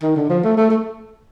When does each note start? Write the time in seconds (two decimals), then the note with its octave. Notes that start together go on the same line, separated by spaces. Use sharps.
0.03 D#3
0.16 D3
0.30 F3
0.44 A3
0.57 A3
0.71 A3